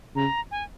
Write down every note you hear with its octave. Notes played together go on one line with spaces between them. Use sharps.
C#3 A#5
G#5